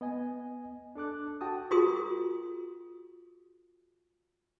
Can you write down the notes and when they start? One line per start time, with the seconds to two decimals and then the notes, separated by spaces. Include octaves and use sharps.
0.01 B3 D#5 G#5
0.95 D4 A4 D6 F#6
1.41 F#4 G5 A5 D#6
1.71 F4 F#4 G#4 A#4 C6 D#6